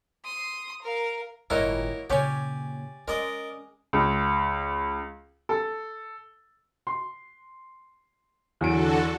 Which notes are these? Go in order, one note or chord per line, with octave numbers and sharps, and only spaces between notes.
C6 D#6
A#4 F5
G1 A2 A#3 E4 F#4 A#4 C#5 D#5
A#2 C#3 C#4 G4 C#5 D5 G#5
G#3 C#4 A#4 D5 D#5
C#2
A4
C6
E2 D3 F#3 F#4 A4 D7